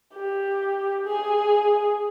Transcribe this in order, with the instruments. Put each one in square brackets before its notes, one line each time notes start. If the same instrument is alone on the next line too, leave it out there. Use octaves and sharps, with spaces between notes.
[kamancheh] G4
G#4